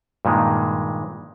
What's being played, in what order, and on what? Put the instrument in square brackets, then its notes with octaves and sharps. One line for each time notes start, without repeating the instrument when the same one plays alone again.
[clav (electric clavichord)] G2 A#2 D#3 G#3